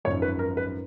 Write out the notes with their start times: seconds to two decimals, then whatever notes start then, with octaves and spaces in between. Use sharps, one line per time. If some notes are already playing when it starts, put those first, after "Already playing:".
0.05 G#1 F#2 F3 C#5
0.22 B4
0.39 A#4
0.57 B4